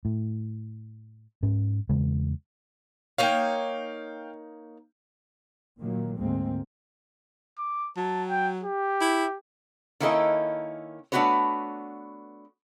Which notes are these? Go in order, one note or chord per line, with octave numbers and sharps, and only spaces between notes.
A2
G#2 C#4
E2 C#3 G#3
A#3 D#4 C#5 F5 G5
A#2 D#3 F#3 A#3
D2 G#2 G#3 A#3 C4
D6
F#3 A5
G5
G4
E4
D#3 A#3 C#4 E4 A4 D#5
A3 B3 D4 F#4 B4 C#5